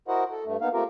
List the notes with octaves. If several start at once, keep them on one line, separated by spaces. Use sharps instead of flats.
E4 F#4 A#4 C5 D#5 F#5
A4
G2 A3
A#3 B3 D#4 F5
A3 A#3 C4 F4 G4 A#4